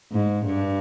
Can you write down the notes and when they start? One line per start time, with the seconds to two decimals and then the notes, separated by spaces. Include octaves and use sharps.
0.12 G#2
0.46 G2